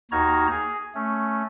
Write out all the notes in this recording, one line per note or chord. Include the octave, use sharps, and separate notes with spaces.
D#2 D#4 F#4 A#5 F6 G#6
G#4
A3 C#4